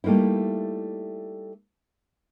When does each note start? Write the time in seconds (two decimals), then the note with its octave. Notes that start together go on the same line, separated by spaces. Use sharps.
0.04 G3 A3 A#3 D#4 E4